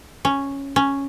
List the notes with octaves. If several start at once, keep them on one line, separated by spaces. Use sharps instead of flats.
C#4
C#4